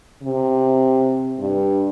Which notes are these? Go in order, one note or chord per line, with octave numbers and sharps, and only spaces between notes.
C3
G2